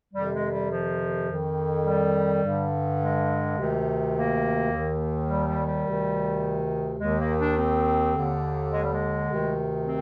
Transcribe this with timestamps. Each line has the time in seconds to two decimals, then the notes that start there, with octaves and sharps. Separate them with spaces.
0.14 F2 C3 D#3 G3
0.33 G#3
0.52 G3
0.71 F3
1.28 F2 D#3
1.85 G3
2.43 G2 D3
3.00 G#3
3.58 D2 C3 D#3
4.15 A#3
4.71 D#2 D#3
5.29 G3
5.47 G3
5.67 G3
5.85 D2 C3 D#3
6.99 D#2 D#3 G#3
7.18 A#3
7.39 D4
7.57 C4
8.15 D#2 D3
8.72 G#3
8.81 G3
8.91 G#3
9.28 D2 C3 D#3
9.85 C4